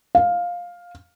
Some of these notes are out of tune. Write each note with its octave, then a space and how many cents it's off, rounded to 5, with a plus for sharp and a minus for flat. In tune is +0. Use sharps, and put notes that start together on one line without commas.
F5 +10